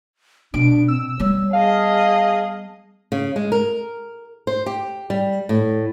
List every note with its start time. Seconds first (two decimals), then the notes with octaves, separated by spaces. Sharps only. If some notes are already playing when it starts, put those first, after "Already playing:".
0.54 B2 D4 D7
0.88 C4 E6
1.20 G3 B3 C#5
1.53 G#4 D#5 F5 A5
3.12 C#3
3.36 G#3
3.52 A#4
4.47 C5
4.66 G4
5.10 G3
5.49 A2